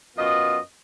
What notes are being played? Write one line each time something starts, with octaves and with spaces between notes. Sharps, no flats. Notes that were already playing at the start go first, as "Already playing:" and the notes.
F#2 B3 F4 D#5